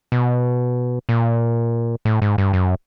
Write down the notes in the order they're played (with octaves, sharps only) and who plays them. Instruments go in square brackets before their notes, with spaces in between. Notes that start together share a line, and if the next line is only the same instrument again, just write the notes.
[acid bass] B2
A#2
A2
G#2
G2
F#2